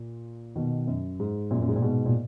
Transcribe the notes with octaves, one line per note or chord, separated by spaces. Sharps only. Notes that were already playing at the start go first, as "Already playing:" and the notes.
Already playing: A#2
B2 D#3
F#2
G#2
F#2 A#2
F#2
G#2
A#2
G#2 B2
A#2